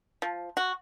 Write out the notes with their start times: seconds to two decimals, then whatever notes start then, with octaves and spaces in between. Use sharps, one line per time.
0.22 F3
0.57 F#4